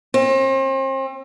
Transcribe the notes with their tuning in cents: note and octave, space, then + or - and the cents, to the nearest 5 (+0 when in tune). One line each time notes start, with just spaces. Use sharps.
C4 +40